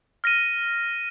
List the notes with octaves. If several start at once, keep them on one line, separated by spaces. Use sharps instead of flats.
F6 A#6 D#7